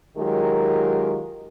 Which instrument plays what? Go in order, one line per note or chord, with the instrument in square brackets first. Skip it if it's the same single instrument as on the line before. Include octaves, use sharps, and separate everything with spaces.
[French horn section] D#3 F#3 G#3 F4 G4 A#4